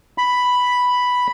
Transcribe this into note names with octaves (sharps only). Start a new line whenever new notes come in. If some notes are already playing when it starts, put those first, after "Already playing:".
B5